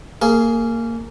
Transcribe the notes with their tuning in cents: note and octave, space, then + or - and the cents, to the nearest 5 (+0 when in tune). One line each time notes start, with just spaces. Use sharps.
A#3 -20 G#4 +10